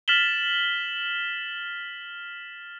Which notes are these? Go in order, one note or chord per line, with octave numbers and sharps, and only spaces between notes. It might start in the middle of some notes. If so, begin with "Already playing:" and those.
F6 A6 B6 E7 F#7 G7